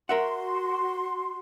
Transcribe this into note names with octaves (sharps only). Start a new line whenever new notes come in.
F#4 A#4 E5 F#5 C6